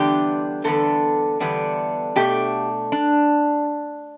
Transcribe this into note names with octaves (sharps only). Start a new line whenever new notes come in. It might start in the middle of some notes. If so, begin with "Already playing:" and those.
Already playing: E2 D3 G3 B3 D4 G4
E2 D3 G3 B3 D4 A4
E2 D3 G3 B3 D4
B2 A3 D4 G4
D4